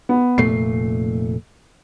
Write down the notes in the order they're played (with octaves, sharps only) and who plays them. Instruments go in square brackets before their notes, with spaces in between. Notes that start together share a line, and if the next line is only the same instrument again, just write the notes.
[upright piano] B3
[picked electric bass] F1 A#2 A3 [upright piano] C7